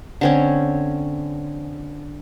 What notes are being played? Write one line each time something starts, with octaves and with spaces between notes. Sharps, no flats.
D3 C4 C#4